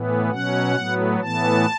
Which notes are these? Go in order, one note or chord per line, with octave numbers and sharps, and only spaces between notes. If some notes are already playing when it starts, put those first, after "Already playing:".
Already playing: A2 E3 B3
B2 F#3 C#4 F#5
A2 F#3 B3
A2 E3 B3 A5